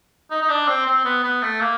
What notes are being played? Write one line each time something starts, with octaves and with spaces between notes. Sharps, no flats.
D#4
D#4
D4
C4
C4
B3
B3
A3
A#3